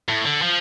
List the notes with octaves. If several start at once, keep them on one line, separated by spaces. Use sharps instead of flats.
A2
D3
F3